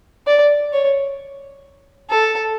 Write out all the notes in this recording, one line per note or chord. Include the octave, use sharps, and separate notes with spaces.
D5
C#5
A4